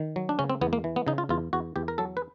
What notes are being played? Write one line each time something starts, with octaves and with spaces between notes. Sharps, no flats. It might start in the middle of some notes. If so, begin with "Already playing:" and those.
Already playing: D#3
F#3
D4
C#3 C#4
C4
E2 B3
A#3
E3
B3
C#3 D#4
F4
E2 F4
E2 F#4
E2 G4
A#4
F#3 A4
B4